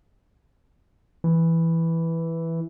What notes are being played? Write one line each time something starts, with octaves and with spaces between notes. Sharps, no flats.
E3